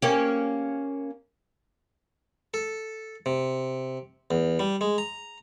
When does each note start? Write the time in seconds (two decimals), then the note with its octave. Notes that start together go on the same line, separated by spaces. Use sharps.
0.02 A#3 C#4 G4
2.54 A4
3.26 C3
4.31 E2
4.59 G3
4.81 G#3
4.98 A#5